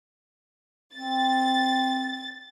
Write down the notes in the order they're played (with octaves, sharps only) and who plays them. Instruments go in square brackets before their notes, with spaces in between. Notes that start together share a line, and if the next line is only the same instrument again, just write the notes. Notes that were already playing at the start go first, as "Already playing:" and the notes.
[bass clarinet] C4 [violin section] A6